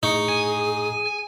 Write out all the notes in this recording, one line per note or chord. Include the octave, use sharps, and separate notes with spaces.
A2 D#4 G#4 C#6 C#7
G#5